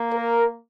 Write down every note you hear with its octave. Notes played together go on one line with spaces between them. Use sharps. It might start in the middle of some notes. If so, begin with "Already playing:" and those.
Already playing: A#3
A#4